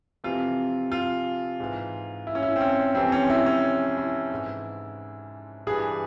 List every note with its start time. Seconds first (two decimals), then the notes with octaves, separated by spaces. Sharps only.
0.24 F2 C3 E3 F4
0.92 F4
1.60 G#2 E3
2.27 E4
2.35 C#4
2.42 E4
2.56 C4
2.61 C#4
2.95 F2 C3 E3 C4
3.12 C#4
3.30 E4
3.46 C#4
3.97 E4
4.31 G#2 E3
5.67 G2 E3 G#4